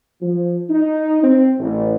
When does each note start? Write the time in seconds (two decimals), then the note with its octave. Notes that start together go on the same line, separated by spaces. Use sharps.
0.22 F3
0.70 D#4
1.24 C4
1.59 A1